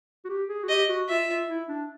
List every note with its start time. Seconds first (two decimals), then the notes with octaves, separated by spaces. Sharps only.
0.25 F#4
0.29 G4
0.49 G#4
0.64 F#4
0.69 G4 D#5
0.89 F#4
1.09 F4 E5
1.29 F4
1.49 E4
1.69 D4